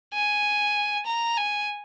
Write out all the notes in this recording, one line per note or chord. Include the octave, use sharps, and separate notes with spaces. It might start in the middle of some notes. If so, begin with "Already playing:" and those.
G#5
A#5
G#5